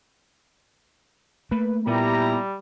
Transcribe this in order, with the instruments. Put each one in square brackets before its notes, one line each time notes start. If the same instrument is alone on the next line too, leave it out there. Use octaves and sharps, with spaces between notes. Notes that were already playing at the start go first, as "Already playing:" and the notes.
[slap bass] A3 A#3 [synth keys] B4
[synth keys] A#2 [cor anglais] G3 [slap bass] B3 [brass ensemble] E4 G4 A#5